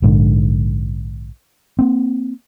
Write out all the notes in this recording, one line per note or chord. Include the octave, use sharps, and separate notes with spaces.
A#1 G#2 D3
A#3 C4